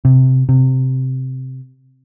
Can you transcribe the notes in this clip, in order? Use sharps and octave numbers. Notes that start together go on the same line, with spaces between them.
C3
C3